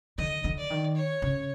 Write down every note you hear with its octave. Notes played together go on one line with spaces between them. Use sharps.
D3 D#5
D3
D5
D#3
C#5
C#3